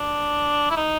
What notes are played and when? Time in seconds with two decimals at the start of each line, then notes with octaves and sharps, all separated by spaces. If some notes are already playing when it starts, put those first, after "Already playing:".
Already playing: D4
0.70 E4
0.76 D#4